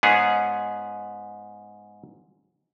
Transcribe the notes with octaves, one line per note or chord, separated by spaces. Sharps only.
G#2 B3 C#4 G#4